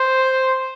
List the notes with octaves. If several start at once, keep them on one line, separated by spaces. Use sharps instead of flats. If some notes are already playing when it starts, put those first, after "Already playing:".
Already playing: C5